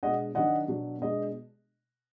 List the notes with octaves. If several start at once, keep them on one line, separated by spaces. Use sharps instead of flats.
B2 G#3 D4 D#5 F#5
D#3 F#3 D4 D#5 F#5
B2 F#3 D4
B2 G#3 D4 D#5